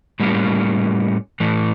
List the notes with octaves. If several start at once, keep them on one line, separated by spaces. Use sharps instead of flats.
A2 G3 A#3 C#4
A2 E3 A3